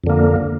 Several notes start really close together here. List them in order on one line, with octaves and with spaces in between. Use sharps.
F2 D3 A#3